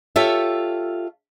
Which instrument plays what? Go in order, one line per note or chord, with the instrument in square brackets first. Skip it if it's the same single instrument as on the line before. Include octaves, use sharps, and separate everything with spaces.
[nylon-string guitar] F4 G4 A4 C#5 E5